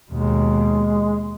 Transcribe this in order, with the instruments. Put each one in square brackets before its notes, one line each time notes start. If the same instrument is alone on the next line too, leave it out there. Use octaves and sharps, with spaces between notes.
[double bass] D#2 B2 [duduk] G#3